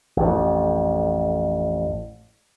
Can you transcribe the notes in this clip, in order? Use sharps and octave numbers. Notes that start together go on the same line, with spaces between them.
A1 F2